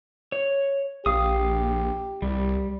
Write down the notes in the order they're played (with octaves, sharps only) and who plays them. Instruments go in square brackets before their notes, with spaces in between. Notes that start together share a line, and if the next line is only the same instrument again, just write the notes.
[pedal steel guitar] C#5
[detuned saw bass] A#1 [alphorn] G4 [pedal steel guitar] F5 D#6
[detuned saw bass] C2 [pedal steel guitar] G3